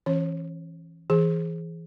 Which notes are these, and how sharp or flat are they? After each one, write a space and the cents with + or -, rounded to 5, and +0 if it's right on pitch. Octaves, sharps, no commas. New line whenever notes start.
E3 +0 C#4 -15 C#5 -25
E3 +0 G#4 +0